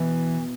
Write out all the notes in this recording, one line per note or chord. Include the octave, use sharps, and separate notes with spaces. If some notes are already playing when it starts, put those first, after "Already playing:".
Already playing: B2 E3 B3 E4